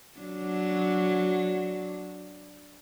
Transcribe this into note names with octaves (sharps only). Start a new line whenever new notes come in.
F#3 D4